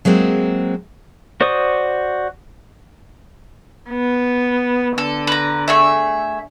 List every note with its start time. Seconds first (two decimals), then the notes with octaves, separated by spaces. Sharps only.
0.05 F#3 G#3 A#3 C4
1.41 F#4 C5 D5 C#6 D#6
3.90 B3
4.98 D3 A4
5.27 B4 A#5
5.68 A3 G#4 E5